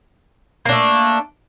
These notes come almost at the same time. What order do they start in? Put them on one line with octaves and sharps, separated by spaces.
A#3 D4 A3